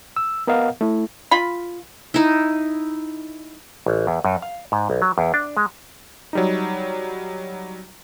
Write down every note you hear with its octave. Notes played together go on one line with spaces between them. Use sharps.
E6
B3 A#4 D#5 F5 F#5
A3 E4
F4 B5
D#4 E4
A1
E2
F#2
F5
G#2
B1
F#3
E2
D4
G#3
F#3 G3 D#4